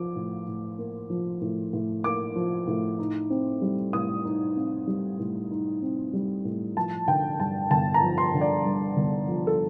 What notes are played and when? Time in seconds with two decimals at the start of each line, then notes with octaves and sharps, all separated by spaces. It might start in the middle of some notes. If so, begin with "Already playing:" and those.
Already playing: F3 D6
0.16 A2
0.47 A2
0.78 A#3
1.10 F3
1.41 A2
1.73 A2
2.04 A#3 D6
2.36 F3
2.67 A2
2.99 D#4
3.30 C4
3.62 G3
3.93 A2 D#6
4.25 D#4
4.56 C4
4.87 G3
5.19 A2
5.51 D#4
5.82 C4
6.13 G3
6.45 A2
6.76 F3 A5
7.08 D3 G5
7.39 G2 A5
7.71 G1 A5
7.94 A#5
8.02 F3
8.18 C6
8.34 D3
8.41 D5
8.65 G2
8.97 G1
9.28 F3
9.47 A4